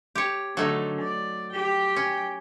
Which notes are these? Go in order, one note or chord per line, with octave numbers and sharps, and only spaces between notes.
G4 C#5
D3 F#3 A3 D#4
D5
G4 G5
C#4